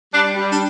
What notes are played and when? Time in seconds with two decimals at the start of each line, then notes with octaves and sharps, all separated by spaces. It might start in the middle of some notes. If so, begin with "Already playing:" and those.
0.14 G3 D4
0.36 G3
0.52 D4